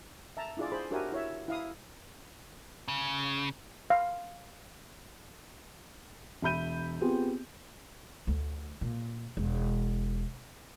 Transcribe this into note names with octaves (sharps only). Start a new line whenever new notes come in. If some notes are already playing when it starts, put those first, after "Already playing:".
E5 A5 A#5
D4 E4 F4 G#4 D5
G#4 C5 B5
D4 F#4 G4 A#4 E5 G#5
E4 C#5 E5
E4 F5 D#6
C#3
F5
E1 E5 B5 G6 D#7
B3 C4 F4 G4 G#4
D2
A#2
E1